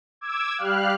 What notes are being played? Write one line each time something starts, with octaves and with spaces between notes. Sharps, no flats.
D6 E6 G#6
G3 G4 F5 F6 F#6